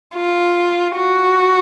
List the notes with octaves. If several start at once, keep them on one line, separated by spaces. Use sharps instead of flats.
F4
F#4